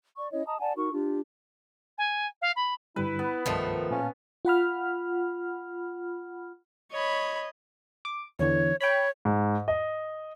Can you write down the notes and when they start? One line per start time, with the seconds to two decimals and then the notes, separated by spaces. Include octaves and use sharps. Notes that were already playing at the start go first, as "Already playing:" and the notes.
0.17 D5 C#6
0.32 C#4 E4 C#5 D#5
0.46 D#5 A5 A#5 D#6
0.60 D5 F#5 G#5 A5
0.76 D#4 F#4 A#4 C#6
0.92 D4 F4 G4
1.98 G#5
2.41 F5
2.56 B5
2.96 G2 D3 G3 E4 B4
3.19 B3
3.46 C2 G2 D#3 F3 A3 D#4 A5
3.91 A#2 C#4 F5 A5
4.45 F4 F#5 B5 F6
6.92 C#5 D#5 B5
8.05 D6
8.39 E2 D3 E3 C#5
8.81 C#5 G5 B5
9.25 G#2
9.68 D#5